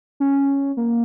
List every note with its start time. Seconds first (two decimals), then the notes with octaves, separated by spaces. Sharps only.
0.20 C#4
0.77 A#3